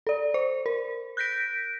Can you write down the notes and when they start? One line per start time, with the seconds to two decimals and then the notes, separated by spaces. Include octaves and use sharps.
0.07 A4 D5
0.34 C5
0.66 A#4
1.17 F#6 G6 A#6 B6 D7